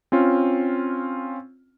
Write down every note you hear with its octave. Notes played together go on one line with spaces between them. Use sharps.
C4 C#4 F4